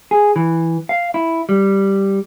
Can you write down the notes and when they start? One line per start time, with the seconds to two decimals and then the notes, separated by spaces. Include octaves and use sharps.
0.11 G#4
0.36 E3
0.89 F5
1.14 E4
1.49 G3